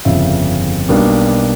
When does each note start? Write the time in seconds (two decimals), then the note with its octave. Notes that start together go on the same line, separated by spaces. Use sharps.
0.05 G1 F2 C#3 F3 E5
0.89 B1 B2 G3 A#3 D4